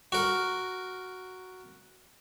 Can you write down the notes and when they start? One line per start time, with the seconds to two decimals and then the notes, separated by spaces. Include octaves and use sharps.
0.12 F#4 A#4